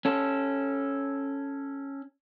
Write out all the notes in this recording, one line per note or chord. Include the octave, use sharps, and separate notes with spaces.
C#4 A4